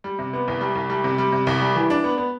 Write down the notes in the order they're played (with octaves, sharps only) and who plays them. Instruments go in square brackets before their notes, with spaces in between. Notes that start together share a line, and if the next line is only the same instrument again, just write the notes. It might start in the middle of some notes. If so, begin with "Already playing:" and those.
[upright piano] G3
C3
B3
C2
G3
C2
G3
C3
G3
C3
C2
G3
E3
D4
B3
B3